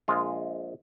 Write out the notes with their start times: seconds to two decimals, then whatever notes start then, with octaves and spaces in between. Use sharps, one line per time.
0.08 A#1 G#3 F4